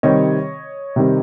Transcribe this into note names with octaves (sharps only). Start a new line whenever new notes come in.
C3 D#3 G3 C4 C#5 D#5
C3 D#3 G3 C4